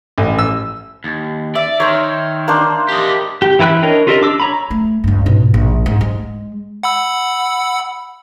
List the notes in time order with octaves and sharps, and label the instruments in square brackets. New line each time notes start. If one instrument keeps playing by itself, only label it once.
[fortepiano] A1
E6
[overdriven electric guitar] D#2
[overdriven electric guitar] D5 [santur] E5
[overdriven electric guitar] D#3 [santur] C5 C#5
[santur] A#3 D4 C5
[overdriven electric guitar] G4 D#5
[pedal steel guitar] G4
E3 E4 B4 G5 F#6
D4 A#4 C#5 D#5
F4 G4 A4 A#4 D#5
D4 D6 E6
C#5 A#5 B5
[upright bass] A3
C#2 G2
G#2 B2
A#1
G#2
G#3
[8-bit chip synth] F#5 B5 E6